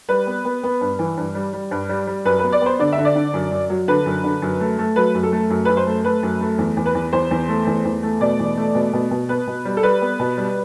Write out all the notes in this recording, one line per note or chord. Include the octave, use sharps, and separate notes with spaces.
G3 B4
B3
B3
B3
G2
E3
G2
G3
G3
G2
G3
G3
F#2 B4
B4
B3
D5
B3 C5
D3 D5
E5
D3
D5
D3
F#2
F#2
F#3
D3 B4
F#2
D3
F#2
A3
A3
F#3 B4
F#2
A4
A3
F#2
F#2 B4
C5
A3
A3 B4
F#2
A3
E2
E2
B4
E2
E2 C5
E2
A3
E2
E2
A3
B2 D5
E2
A3
B2
B2
B2
B3 B4
B2
G3
A4
G3 B4
B3
B2
G3